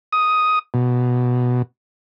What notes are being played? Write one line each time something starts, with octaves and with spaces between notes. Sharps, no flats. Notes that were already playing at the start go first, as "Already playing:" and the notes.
D#6
B2